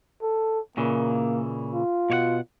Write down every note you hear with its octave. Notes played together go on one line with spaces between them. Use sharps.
A4
A#2 C#3 E3 A#3
F4
B2 C#5 F#5